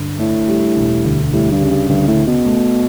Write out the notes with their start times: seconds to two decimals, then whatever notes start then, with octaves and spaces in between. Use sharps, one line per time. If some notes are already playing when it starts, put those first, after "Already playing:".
Already playing: G2 D3
0.19 A2 D4
0.48 G3
0.76 E1
1.04 D2
1.32 A2 G3
1.52 G2
1.61 C#3
1.70 G2
1.89 D2 G2
2.07 A2
2.17 C#3
2.27 B2
2.45 A3